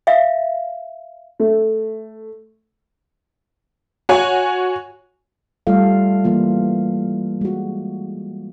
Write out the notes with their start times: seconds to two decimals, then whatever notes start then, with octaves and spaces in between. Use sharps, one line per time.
0.07 E5 F5
1.40 A3
4.09 F#4 C#5 G#5
5.67 G3 A3 F4 A4 F5
6.24 E3 A#3 F4
7.41 G#3 F#4